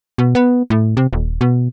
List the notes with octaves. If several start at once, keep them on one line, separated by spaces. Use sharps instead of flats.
B2
B3
A2
C3
D#1
B2